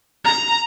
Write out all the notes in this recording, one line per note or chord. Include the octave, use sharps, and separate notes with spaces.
A#5